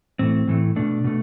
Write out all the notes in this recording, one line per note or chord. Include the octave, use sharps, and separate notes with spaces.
A2 E3 A3 C4
A2 E3 A3
B2 A3 D4
B2 A3